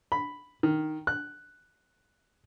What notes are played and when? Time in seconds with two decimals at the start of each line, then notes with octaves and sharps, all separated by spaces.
0.12 B5
0.63 D#3
1.07 F#6